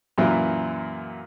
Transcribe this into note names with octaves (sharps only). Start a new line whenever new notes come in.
F#2 A#2 E3 E4